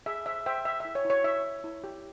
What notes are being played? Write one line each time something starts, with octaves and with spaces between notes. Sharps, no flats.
G#4 E5
C5 E5
C5 E5 G5
C5 E5
E4 E5
C#5
E4
C#5
E4 E5
C#5
E4
G4